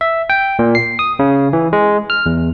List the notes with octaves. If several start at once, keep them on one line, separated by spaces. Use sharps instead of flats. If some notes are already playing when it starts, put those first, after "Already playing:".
E5
G5
A#2
C7
D#6
C#3
E3
G#3
F6
E2